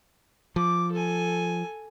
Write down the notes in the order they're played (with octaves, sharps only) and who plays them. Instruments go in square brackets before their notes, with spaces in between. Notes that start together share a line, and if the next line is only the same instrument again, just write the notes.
[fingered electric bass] F3 [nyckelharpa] D6
[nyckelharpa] A4 G#5